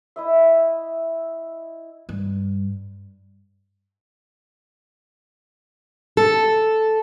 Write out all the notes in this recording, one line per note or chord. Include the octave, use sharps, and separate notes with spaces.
E4 D#5 E5
G2
A4